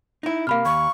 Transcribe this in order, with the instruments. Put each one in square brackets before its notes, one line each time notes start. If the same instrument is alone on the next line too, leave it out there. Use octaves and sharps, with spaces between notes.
[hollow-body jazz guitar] D#4 E4
[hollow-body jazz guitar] C3 A#3 [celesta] F5 B5 F6
[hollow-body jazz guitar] D#2 [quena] C#6